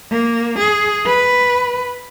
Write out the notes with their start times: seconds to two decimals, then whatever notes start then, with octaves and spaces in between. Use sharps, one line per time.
0.12 A#3
0.59 G#4
1.06 B4